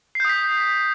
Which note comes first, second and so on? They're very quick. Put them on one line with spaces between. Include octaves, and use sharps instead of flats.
C7 G6 D#6 B6